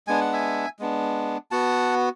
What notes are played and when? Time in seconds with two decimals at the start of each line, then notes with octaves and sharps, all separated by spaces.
0.07 G#3 B3 D4 G#5
0.21 F#5
0.33 E5 G#5
0.79 G#3 B3 D4
1.51 B3 F#4 F#5 A5